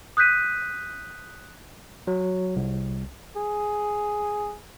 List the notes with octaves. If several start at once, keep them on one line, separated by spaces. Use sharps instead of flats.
D#6 F#6 G6 B6 D#7
F#3
C2
G#4